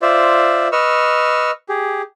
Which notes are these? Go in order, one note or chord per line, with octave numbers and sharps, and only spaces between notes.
F4 C5 D5 E5
B4 D#5 C#6 E6 F6
G4 G#4